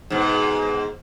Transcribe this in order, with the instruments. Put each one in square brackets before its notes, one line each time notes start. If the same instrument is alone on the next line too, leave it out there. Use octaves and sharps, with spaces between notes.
[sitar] G#2 B2